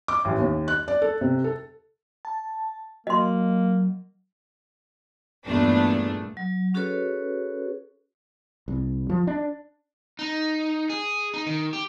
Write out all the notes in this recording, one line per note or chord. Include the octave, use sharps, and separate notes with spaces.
D6
A1
D#2
F#6
D5
A4
C3
A4
A5
F#3 A#3 D#5 C6
E2 G2 A#2 A3 B3 D4
F#3
C#4 F#4 G#4 A4 B4 C#5
C2
F3
D4
D#4
G#4
D#4
D#3
G4